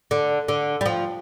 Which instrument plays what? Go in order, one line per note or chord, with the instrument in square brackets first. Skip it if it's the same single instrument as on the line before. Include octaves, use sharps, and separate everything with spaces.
[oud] D3
D3
G3
F3